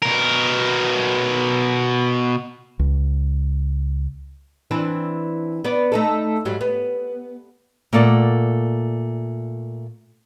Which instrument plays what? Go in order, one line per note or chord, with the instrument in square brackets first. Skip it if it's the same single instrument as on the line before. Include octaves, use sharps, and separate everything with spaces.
[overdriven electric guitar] B2 A#4
[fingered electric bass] C#2
[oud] E3 C4 D4
B3 D5
A3 D#4 A4
G#2 F#3 G3
B3
[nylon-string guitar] A#2 A3 A#3 D5 F#5